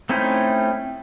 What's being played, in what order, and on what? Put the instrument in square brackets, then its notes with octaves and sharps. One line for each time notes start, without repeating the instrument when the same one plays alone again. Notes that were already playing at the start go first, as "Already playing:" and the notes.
[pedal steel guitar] A3 C4 C#4 D#4 E4